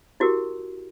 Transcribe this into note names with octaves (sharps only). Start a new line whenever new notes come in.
E4 F#4 G4 A#4